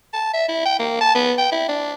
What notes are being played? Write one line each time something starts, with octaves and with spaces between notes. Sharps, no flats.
A5
E5
E4
G5
A#3
A5
B3
G5
E4
D4